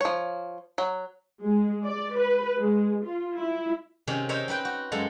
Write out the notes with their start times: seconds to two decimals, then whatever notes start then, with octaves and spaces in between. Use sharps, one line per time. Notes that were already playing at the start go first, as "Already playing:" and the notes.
0.01 F3 C#5
0.78 F#3
1.42 G#3
1.85 D5
2.17 B4
2.59 G#3
3.05 F4
3.38 E4
4.07 C3 D#3 C#4 G#4
4.29 D#4 A#4 C5 C#5 E5
4.48 C4 D#4 B4 G5
4.65 F#4
4.92 F#2 G#3 A4 F5